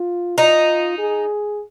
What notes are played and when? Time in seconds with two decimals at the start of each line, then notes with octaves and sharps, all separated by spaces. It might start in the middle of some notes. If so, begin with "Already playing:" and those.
Already playing: F4
0.38 D#4 F4
0.98 G#4